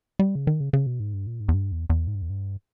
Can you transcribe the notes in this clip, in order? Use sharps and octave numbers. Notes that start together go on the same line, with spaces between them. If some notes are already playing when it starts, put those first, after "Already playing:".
G3
C#3
D#3
C#3
C#3
B2
G#2
G2
A#2
G#2
E2
G2
E2
E2
G#2
G2
E2
G2